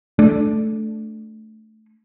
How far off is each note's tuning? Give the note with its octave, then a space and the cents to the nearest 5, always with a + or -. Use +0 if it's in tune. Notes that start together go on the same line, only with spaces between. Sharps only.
A3 -10 D4 +0